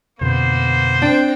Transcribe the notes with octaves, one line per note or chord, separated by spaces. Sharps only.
F2 B2 D3 A#3 B3 C5
C4 D4 G5